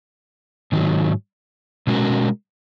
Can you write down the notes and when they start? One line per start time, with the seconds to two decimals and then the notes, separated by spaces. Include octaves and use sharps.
0.72 G#2 D#3 F#3
1.87 B2 G#3 C#4 F#4 A#4